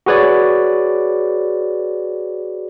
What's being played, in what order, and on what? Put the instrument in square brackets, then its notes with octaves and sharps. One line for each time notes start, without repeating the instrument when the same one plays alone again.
[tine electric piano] F#4 G#4 B4 C#5 D5